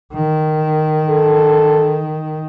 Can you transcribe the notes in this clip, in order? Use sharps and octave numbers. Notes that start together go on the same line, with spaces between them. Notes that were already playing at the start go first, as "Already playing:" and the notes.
D#3
A4